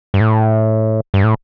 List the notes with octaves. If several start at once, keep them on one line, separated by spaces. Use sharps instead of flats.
G2
A2
G2
A2